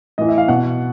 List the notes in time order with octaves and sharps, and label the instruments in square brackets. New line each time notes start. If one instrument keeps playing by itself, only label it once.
[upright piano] A2 E3 D#5
E5
F5
B2 F#5